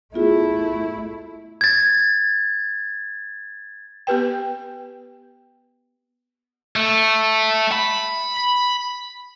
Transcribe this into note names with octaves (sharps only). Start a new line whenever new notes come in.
A3 B3 E4 F4 G#4
G#6 A6
B3 G4 B4 G5
A3
B5